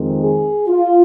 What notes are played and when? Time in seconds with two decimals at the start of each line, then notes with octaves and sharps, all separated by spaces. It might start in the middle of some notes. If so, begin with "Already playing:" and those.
Already playing: F2 D#3 G#3 C4
0.23 G#4
0.67 F4